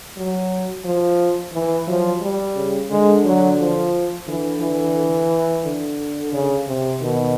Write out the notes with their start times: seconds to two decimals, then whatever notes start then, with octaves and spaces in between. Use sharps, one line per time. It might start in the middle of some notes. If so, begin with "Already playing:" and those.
0.17 F#3
0.85 F3
1.53 E3
1.88 F3 F#3
2.21 G3
2.56 C#3
2.90 D3 G#3
3.24 F#3
3.59 F3
4.27 D3 E3
4.61 E3
5.65 D3
6.33 C#3
6.67 C3
7.01 B2 D#3